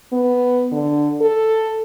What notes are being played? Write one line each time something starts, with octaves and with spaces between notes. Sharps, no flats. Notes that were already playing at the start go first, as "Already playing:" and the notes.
B3
D3
A4